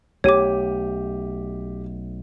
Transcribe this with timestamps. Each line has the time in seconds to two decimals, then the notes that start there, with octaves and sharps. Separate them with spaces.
0.24 B1 A3 G4 C#5 D6 D#7